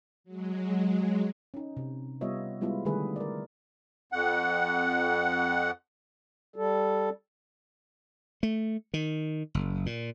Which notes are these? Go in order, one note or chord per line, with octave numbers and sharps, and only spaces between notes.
F#3 G#3
C#4 D#4
C3
G3 B3 F4 C#5 D#5 E5
G3 G#3 B3 E4 F4
D3 D#3 G3 A3 G#4 B4
A#4 D5
F2 F#5
G3 A4
A3
D#3
F#1
A#2